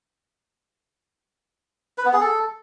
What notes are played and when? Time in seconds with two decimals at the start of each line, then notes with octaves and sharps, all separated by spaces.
1.98 B4
2.06 B3
2.13 G#4
2.21 A4